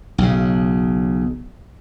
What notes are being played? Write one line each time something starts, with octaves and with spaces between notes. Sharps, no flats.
B1 C#3